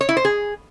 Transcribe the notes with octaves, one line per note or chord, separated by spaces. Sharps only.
C#5
E4
C5
G#4